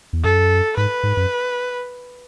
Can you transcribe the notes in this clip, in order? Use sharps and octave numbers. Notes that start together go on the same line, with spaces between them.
E2
F#2 A4
G#2 B4
G#2
F#2